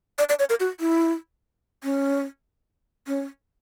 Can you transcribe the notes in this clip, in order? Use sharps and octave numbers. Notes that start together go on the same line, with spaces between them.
D5
D5
C#5
A#4
F#4
E4
C#4
C#4